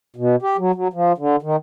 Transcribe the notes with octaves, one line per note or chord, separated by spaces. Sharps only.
B2
G4
F#3
F#3
F3
D3
D#3